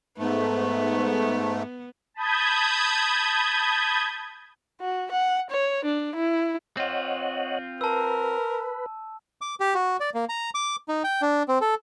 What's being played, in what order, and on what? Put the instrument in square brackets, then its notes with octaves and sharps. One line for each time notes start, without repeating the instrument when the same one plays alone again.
[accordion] G#2 A3 [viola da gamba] B3
[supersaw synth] A5 B5 D#6 G6 G#6
[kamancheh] F#4
F#5
C#5
D4
E4
[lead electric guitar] C4 F4 [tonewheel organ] C#5 D#5 F#5
[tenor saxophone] A#4 [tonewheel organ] B4 [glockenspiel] A5 E6
[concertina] D6
G4
F#4
D5
A#3
A#5
D6
D#4
G5
D4
C4
A4